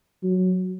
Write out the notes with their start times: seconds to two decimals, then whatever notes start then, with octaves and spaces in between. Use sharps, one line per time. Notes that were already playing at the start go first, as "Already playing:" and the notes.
0.23 F#3